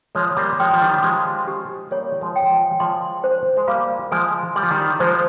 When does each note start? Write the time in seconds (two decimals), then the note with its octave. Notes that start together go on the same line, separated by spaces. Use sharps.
0.15 F3 G#3 C#5
0.37 G3 A#3
0.59 F3 G#3 G5
0.73 F3
0.82 D#3 G3
1.03 F3 G#3 G4
1.47 G4
1.91 G3 A#3 C#5
2.21 F3 G#3
2.36 G5
2.50 F3 G#3
2.80 F3 G#3 C6
3.24 C5
3.57 G#3
3.67 G3 A#3 F5
4.11 F3 G#3 G#5
4.56 G3 C6
4.63 F3
4.71 D#3 G3
4.99 F3 G#3 C5